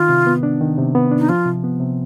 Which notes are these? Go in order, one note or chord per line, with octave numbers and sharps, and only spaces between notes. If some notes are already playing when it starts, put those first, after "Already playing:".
Already playing: D#3 F4
C3
B3
D4
D#3
C3
B3
D4
D#4
F3 F4
C3
B3
C3